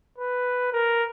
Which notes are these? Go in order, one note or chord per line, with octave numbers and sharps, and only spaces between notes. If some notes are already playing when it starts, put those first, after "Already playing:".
B4
A#4